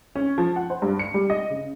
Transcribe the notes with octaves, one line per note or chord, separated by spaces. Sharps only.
C#4
F3
F#5
C5
G2
C#7
G3
D#5
C#3